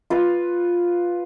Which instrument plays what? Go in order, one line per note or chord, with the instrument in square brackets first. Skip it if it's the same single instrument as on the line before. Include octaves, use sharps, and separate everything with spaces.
[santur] F4 B4